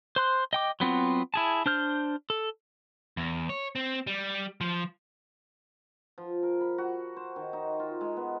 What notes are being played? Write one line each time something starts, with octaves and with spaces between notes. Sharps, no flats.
C5 C6 F#6
D#5 G5 D6
F#3 B3 C4 F4
E4 G#4 A5
D4 C5 F6 G6
A4
E2
C#5
C4
G3
F3
F3
A#4
B5
F#4
C5
D#3
D#4
F4
G#3
B3